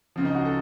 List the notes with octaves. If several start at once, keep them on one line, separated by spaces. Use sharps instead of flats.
C#2 C#3 F3
D#4
F#4
A4